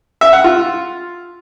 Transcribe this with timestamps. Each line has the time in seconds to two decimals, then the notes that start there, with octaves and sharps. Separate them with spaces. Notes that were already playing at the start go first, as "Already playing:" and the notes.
0.21 E5
0.33 F#5
0.44 F4